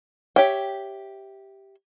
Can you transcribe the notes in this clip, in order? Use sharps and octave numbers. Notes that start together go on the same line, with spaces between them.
G4 C#5 E5 G5